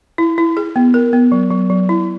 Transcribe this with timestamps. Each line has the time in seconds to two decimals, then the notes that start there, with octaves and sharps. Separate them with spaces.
0.18 E4
0.38 E4
0.57 G#4
0.76 B3
0.94 A#4
1.13 B3
1.32 F#3
1.50 F#3
1.70 F#3
1.89 E4